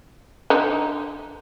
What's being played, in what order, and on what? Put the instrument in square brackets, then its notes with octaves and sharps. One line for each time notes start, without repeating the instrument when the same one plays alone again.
[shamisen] D3 D#4